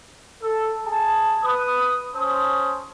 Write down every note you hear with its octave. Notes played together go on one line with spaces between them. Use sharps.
A4
G#4 A5
B4 D#6
C#4 C5 A5 D#6